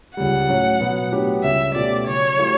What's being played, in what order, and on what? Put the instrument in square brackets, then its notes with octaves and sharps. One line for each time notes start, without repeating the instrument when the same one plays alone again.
[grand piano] C#2 C#3 G3 [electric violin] F#5
[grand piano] A2 F#3 C#4
B2 F#3 B3
A2 F#3 B3 D4 G4
[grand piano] C#2 C#3 G3 C#4 [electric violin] E5
[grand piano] B2 A3 C#4 G4 [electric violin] D5
[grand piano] C#3 F#3 C#4 [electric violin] C#5
[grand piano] F#3 A3 E4 G4